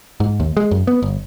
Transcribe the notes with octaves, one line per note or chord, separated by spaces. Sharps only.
G#2
D#2
G#3
F#2
B3
G1